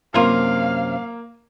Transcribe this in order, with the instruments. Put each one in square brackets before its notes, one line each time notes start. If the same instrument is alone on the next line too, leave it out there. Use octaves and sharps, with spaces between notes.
[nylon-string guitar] F#2 C3 [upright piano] A#3 [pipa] F4 A#4 [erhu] F5